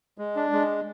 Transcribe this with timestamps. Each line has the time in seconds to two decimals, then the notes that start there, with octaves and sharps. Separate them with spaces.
0.18 G#3
0.36 D4
0.53 G#3